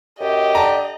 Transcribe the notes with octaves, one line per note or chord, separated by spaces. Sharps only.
F#2 G4 D#5
D3 A5 A#5